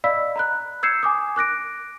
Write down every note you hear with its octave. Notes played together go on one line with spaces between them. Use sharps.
D5 D#5 F5 B5 E6 B6
A#5 B5 F#6
E6 G6 G#6 C7 C#7 E7
G#5 D6 D#6
D6 F#6 A#6 D7